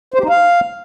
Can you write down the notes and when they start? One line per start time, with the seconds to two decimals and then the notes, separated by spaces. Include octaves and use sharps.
0.14 C5
0.19 G4
0.24 D#4
0.29 F5